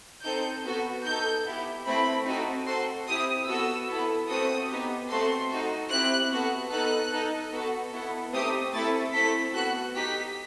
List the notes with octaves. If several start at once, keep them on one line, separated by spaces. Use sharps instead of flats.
C4 D#4 A4 G6
B3 F#4 A4
D#4 A4 G6
B3 E4 G4
A3 C4 E4 B5
C4 D#4 F#4 A4
C4 F#4 A4 C6
C4 E4 G4 D#6
B3 F#4 A4 E6
B3 E4 A4
A3 C4 F#4 A4 D#6
B3 D#4 G4
A3 C4 F#4 A4 C6
D#4 F#4 A4
C4 E4 G4 F#6
B3 F#4 A4
B3 D#4 A4 F#6
D#4 A4
B3 F#4 A4
B3 E4 A4
A3 C4 D#4 G4 D#6
A3 C4 E4 A4 A6
A3 C4 E4 A4 B6
B3 F#4 A4 F#6
D#4 G4 B6